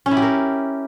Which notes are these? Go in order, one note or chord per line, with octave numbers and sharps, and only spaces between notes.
C#4
E4
G4
A#4